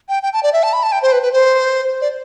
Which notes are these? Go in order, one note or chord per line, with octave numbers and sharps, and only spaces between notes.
G5
G5
A5
D5
E5
A5
B5
A5
G5
C5
B4
B4
C5
D5